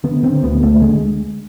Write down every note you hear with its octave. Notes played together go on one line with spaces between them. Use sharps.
D3 B3
D3 C4
D2 B3
D2 A3
D3 G#3